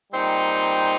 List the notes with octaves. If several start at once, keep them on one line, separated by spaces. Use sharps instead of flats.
A#2 G3 C4 D#4